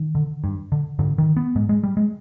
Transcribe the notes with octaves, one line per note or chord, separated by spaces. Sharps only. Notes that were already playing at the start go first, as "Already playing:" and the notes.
Already playing: D#3
D3
G2
D3
G#2 D3
D#3
B3
G#2 G#3
G#3
G3
G#3